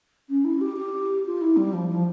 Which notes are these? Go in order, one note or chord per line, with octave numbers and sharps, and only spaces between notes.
C#4
E4
G4
G4
F4
E4
G3
F3
F3